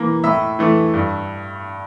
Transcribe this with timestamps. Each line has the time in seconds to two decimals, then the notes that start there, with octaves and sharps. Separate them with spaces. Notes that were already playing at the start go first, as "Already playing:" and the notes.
Already playing: E3 A#3
0.24 A2 E5
0.59 E3 A3
0.94 G2